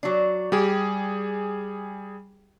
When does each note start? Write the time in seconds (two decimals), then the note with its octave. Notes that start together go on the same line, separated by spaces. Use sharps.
0.03 F#3 D4
0.52 G3 G4 G#4